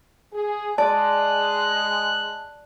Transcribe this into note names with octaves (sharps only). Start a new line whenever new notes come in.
G#4
G#3 D5 A5 F#6